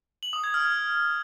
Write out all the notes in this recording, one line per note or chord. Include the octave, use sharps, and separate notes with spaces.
F#7
D#6
G#6
F6